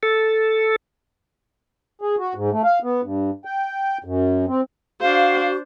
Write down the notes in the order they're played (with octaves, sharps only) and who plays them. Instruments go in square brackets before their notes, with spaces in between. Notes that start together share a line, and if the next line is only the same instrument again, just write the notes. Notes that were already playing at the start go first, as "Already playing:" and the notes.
[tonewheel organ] A4
[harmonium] G#4
F#4
G#2
A3
F5
B3
G2
G5
F#2
C4
[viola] D4 C5 [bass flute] F#4 [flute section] F5